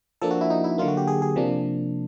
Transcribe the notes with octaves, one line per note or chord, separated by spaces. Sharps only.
F3 A#3 D4 A4
F#4
E4
D#4
E4
D3 F#3 A#3 F4
F#4
G4
G#4
G#4
C3 F3 A#3 D4